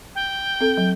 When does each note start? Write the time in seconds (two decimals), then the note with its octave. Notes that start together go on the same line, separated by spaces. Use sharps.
0.15 G5
0.61 C4 A4
0.77 F#3